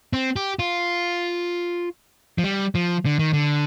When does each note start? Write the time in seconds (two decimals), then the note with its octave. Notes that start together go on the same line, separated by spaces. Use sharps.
0.13 C4
0.36 G4
0.59 F4
2.38 F3
2.44 G3
2.75 F3
3.06 D3
3.19 D#3
3.33 D3